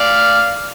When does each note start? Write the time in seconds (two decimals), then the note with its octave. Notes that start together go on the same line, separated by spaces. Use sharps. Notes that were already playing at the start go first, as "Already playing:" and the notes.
Already playing: D5 F5